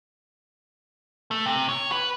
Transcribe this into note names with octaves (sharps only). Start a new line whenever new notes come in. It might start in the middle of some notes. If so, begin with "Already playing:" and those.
A3
C3
C#5
B4